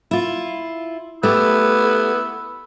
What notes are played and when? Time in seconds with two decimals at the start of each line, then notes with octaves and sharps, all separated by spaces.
0.11 E4 F4
1.23 A3 B3 E4 G4